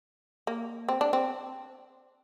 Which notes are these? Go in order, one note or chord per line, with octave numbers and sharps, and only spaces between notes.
A#3
C4
D4
C4